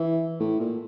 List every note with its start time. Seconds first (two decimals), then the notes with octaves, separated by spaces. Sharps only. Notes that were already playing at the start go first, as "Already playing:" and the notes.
Already playing: E3
0.40 A2
0.60 A#2